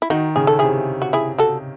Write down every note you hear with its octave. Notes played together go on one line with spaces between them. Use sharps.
E4
D#3 D#4 F#4
C#3 G#4
A4
C3 E4 G#4
F#4
E4 G#4
F#4 A4